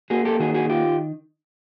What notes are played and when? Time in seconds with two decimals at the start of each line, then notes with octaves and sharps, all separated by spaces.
0.10 A#3 F#4 G#4
0.25 G4 A4
0.40 D#3 F#4 G#4
0.54 F#4 G#4
0.70 F4 G4